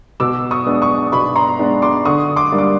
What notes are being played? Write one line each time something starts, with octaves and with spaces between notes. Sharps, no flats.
B2 D6 E6
C#6 D#6
G#3 B3 D4
C#6 D#6
B2 B5 C#6
A#5 C6
G#3 B3 D4
C6 D6
D3 C#6 D#6
C6 D6
G3 A#3 D4
D6